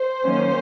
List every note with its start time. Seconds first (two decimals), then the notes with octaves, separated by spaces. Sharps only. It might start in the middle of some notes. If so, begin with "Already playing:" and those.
Already playing: C5
0.22 D#3 F#3 A#3 C#4